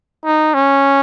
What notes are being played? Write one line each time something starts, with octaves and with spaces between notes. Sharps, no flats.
D#4
C#4